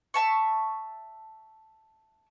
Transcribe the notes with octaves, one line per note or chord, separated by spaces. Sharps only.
E5 A5 C#6